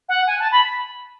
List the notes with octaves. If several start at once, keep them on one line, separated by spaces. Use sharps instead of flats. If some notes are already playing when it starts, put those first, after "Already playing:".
F#5
G#5
A5
B5